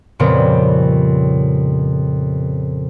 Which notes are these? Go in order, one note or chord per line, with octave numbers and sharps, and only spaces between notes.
F2 A#2 C#3 G3 B3 C4